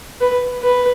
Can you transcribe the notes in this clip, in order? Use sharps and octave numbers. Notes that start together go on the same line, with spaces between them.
B4
B4